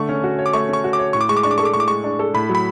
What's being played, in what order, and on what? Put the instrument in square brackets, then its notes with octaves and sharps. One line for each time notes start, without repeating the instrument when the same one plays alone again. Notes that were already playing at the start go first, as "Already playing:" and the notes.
Already playing: [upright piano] D3 A3 [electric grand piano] C#6
[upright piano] C#4
F#4
C#5
[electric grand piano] D6
[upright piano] A3 [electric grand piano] C#6
[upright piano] C#4 [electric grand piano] C#6
[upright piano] F#4
[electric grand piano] D6
[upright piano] C#5
[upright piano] A2 [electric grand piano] C#6
[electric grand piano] D6
[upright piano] G#3 [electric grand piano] C#6
[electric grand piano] D6
[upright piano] D4 [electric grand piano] C#6
[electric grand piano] D6
[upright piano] A4 [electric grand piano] C#6
[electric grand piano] D6
[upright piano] A2 [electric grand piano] C#6
[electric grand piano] D6
[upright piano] G#3 [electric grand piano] C#6
[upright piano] D4
A4
[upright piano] A2 [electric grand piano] B5
[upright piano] F#3
[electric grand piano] B5